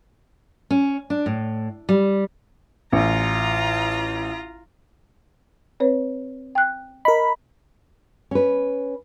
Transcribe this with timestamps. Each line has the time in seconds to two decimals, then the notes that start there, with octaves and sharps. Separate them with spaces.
0.70 C#4
1.10 D4
1.26 A2
1.89 G3
2.93 A1 F4 A#5
5.80 C4 B4 C#5
6.55 G5 F#6
7.05 A#4 D#5 B5
8.31 C#4 B4